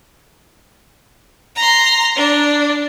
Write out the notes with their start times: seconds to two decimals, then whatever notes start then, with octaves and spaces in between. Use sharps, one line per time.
1.56 A#5 C6
2.17 D4